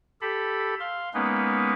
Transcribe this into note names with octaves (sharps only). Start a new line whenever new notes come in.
G4 A4 B5
F5 C6
G#3 A#3 B3 C#4 D#4 B4